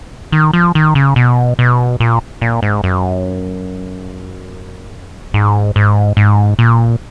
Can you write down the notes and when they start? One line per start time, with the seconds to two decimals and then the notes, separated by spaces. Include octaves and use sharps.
0.32 D#3
0.53 F3
0.75 D#3
0.95 C#3
1.16 B2
1.59 B2
2.00 A#2
2.41 A#2
2.63 G#2
2.84 F#2
5.34 G#2
5.76 G#2
6.17 G#2
6.59 A#2